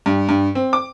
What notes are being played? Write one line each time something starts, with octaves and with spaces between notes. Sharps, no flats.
G2
G2
C4
D6